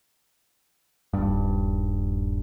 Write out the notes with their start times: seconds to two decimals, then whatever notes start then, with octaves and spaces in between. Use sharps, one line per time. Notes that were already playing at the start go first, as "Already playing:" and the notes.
1.14 D#1 G2